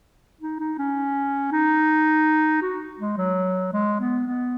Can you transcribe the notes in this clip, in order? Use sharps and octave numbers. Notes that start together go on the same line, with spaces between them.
D#4
D#4
C#4
D#4
F#4
G#3
F#3
G#3
B3
B3